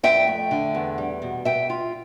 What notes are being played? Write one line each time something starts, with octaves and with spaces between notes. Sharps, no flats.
F2 E5 G5
A3
D3
E2
G3
B2
B2 E5 G5
F4